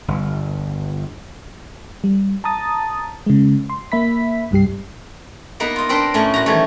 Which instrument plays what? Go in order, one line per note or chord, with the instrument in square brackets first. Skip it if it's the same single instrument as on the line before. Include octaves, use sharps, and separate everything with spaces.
[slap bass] G1
[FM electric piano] G3
A5 A#5 D#6 A6
C#3 G#3
C6
A#3 E5 B5 B6
C2 G2 G3 G4 C7
[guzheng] A#3 B3 D#4 B4
F4 D#5
C4 D4 A#4 B4 G5 C6
A2 A3 C#4
A#2 F#4 A#5
D#3 E3 G3 A3 C#5